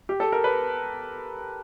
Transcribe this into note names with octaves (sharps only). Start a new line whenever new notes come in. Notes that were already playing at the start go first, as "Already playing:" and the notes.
G4
A4
A#4
B4